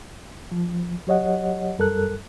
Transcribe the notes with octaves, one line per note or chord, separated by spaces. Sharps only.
F3
F#3 G4 C#5 D#5 F#5
F#2 G3 A4 A#4 F#6